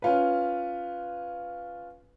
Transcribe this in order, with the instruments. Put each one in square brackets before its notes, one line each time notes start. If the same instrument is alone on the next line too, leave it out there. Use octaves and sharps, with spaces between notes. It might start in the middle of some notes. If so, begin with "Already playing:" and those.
[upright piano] C#4 F4 B4